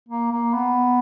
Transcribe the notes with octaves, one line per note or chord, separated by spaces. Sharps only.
A#3
A#3
B3